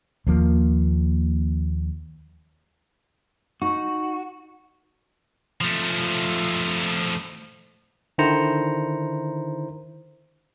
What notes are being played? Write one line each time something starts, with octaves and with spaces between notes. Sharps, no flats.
D#2 F3 A#3
D#4 F#4 C#6
F3 A3
D3 D#3 E4 C5 A#5 C#7